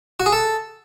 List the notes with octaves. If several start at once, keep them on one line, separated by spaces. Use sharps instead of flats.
F#4
G#4
A4